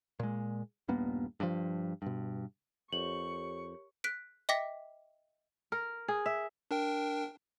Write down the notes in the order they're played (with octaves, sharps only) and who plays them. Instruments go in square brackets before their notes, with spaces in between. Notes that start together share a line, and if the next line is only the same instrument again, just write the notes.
[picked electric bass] A#2 G#3
D#1 G2 A#3 B3
G2 F3
G2 B2
[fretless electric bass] F2 [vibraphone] G4 A#4 C#5 [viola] C#6 [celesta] F#7
[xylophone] F#6 B6 D7
D#5 E5 G5 D6 A#6 B6
[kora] A#4
G#4
E5
[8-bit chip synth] D4 A#4 G5